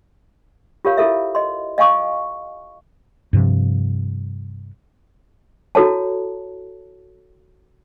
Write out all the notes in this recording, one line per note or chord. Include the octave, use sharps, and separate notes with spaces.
F4 G4 A#4 C#5 F5 B5
E4 F4 A4 A#4 E5
D#5 C6
D#5 F5 G#5 C#6 D#6
G2 C3 F3
E4 F#4 A4 C#5 A5